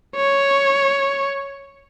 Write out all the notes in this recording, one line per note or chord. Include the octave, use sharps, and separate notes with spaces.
C#5